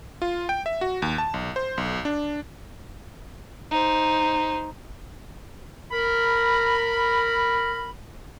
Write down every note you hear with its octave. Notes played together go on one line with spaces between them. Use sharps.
F4
G5
E5
F#4
D#2
A5
B1
C5
B1
D4
D#4 C5
A#4 B5